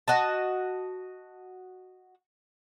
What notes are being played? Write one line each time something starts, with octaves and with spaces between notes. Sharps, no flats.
F#4 D#5 A5